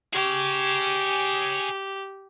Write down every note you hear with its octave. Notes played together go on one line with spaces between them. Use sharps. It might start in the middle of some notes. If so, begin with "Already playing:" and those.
G4 G#4 C#5